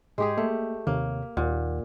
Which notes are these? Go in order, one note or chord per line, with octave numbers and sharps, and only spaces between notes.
G#2 G#3 G4 G#4
A3 A#3
D#2 C3 A#3 C#5
D#2 A#2 F#5